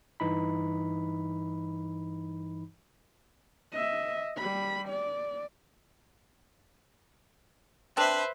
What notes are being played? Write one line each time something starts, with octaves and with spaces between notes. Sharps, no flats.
G2 E3 D#4 B5
D#5 E5
G3 B5
D5
C4 D4 B4 C5 E5